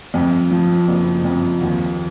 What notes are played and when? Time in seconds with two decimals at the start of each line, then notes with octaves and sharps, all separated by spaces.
0.14 F2
0.51 F3
0.88 F#1
1.24 F2
1.61 D#2